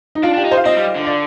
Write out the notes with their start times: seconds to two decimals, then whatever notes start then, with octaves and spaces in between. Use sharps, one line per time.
0.15 D#4
0.23 D4 F4
0.33 D4 G4
0.44 D#4
0.51 C5
0.57 F5
0.65 C4 D#5
0.76 G3
0.96 D3
1.07 D5